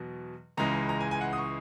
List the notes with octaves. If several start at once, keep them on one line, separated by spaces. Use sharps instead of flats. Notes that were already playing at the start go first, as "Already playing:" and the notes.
Already playing: E2 B2 F#3
C#2 C#3 E3 G#3 A#5
A#5
G#5
G#5
F#5
D#6
C#6